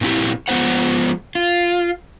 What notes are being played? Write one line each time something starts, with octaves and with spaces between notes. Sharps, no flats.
A#2 C4 D#4 E4 G4
F3 G#3 B3 D#4 C5 F#5
F4